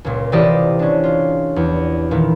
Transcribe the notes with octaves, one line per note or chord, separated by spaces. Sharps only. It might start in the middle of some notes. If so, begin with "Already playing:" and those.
C#2 A#2
C3 E3 F4 G4 D5 D#5
C#4 D4
F4
E2
A#2 D#3 E3